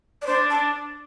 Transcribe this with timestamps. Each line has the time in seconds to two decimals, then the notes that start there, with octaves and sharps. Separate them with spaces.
0.22 D5
0.27 D4 C5
0.50 A5